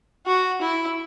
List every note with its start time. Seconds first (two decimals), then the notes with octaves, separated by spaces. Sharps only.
0.27 F#4
0.62 E4